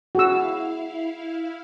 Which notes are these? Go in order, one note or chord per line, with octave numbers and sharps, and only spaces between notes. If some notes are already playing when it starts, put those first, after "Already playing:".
E4 F#4 G#4 F5 E6